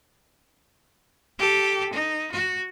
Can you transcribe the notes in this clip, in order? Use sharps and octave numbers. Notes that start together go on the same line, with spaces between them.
G4 A4
D#4
F#4